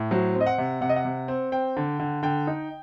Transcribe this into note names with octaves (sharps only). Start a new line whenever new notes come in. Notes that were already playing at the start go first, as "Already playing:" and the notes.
Already playing: A2
F#3 C5
C4
D#5
F#5
C3
C3 F#5
D#5
F#5
C3
C4
C4 G5
D3
D3
D3 G5
D#4